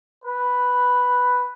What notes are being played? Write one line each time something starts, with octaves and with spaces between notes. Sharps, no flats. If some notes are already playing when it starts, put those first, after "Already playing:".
B4